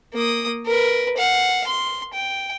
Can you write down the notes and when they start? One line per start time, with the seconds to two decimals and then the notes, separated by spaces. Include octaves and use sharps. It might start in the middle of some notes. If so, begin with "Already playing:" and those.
0.14 A#3 D#6
0.66 A#4 B4
1.17 F5 F#5
1.67 C6
2.14 G5